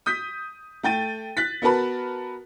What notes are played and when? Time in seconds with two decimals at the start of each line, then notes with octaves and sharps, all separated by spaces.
0.06 D#6 G6 B6
0.83 A3 G5 A6 D#7
1.37 F#6 A6 B6
1.62 B3 F#4 A#4 B4 A5 B5